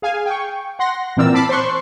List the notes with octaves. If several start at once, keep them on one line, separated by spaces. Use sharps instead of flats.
G#4 F5 G#5
G5 C#6
F#5 C6 A#6
A#2 E3 C4 A#4 D5 E6
A5 B5 D6 C7
C5 C6 C#6 F#6